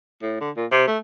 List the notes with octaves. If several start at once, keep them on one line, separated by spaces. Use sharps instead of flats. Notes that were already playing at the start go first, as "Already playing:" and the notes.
A2
D3
A#2
C3
A3